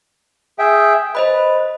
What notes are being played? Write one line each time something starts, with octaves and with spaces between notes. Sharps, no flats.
G#4 E5 G5
B4 C5 D#5 B5